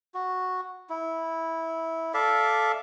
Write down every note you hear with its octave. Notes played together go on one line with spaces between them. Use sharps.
F#4
E4
A4 D5 E5 F5